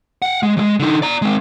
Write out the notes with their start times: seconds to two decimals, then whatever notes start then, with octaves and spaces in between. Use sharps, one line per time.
0.22 F5 F#5
0.43 G#3
0.57 D#2 G#3
0.80 D3 D#4
1.02 D5 A#5
1.22 G#3 C4